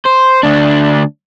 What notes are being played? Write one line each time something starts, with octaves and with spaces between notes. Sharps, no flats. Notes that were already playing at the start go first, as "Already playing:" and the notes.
C5
D2 D4